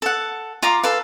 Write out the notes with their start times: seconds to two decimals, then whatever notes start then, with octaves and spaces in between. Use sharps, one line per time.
0.02 A4 F#5
0.62 F4 F5 A#5 D6
0.84 A4 B4 F5